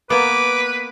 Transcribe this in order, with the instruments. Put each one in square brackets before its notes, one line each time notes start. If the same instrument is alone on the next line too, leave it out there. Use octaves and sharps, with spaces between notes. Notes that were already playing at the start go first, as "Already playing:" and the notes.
[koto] A#3 B3 [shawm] B4 [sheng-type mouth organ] D6